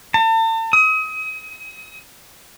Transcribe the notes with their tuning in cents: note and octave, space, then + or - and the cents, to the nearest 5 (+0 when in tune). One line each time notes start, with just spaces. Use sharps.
A5 +40
D#6 +35